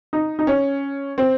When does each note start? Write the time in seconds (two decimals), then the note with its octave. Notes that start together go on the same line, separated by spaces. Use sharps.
0.13 D#4
0.39 D#4
0.47 C#4
1.18 C4